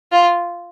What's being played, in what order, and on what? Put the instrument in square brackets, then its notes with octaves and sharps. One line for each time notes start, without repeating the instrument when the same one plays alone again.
[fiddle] F4